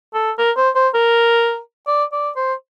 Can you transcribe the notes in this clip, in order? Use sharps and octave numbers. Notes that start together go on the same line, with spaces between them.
A4
A#4
C5
C5
A#4
D5
D5
C5